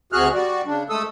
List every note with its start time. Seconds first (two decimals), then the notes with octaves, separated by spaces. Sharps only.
0.13 D2 C3 F#4 G#4 F6 F#6
0.34 G3 F#4 D5
0.66 C#3 D4
0.90 G#3 A3 A4 D#6 E6